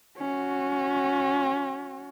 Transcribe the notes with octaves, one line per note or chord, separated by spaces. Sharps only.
C#4 F#4